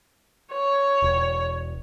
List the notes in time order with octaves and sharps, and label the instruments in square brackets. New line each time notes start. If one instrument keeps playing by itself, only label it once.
[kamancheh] C#5
[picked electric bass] E1